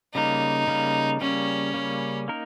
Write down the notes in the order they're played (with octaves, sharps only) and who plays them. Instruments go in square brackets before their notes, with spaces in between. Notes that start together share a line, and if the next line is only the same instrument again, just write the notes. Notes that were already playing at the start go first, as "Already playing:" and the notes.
[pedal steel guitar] C#3 G3 A#3 [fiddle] D#4
[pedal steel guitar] C#3 G3 A#3
[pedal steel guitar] C#3 G3 A#3 [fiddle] C#4
[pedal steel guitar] C#3 G3 A#3
A#3 D#4 A#4